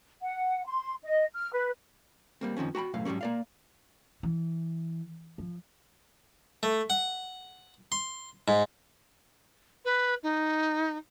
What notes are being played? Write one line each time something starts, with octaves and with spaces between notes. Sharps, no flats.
F#5
C6
D#5
F6
B4
G3 A#3 C4
F#2 D#3 F3 C4 C#4
F#4 G5 A#5 B5
B1 F#2 A2 F5
G#2 F#3 G3 A#3 C#4
A#3 D5 F5
E3
F3
A3
F#5
C6
G#2
B4
D#4